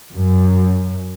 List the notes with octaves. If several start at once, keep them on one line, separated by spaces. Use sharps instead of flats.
F#2